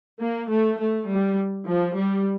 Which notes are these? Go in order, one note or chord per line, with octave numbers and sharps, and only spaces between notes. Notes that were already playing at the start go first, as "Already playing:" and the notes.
A#3
A3
A3
G3
F3
G3